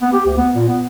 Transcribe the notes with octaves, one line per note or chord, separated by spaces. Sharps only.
B3
G4
D2
B3
A#2
B3